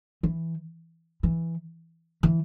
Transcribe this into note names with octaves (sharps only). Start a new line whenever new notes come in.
E3
E3
E3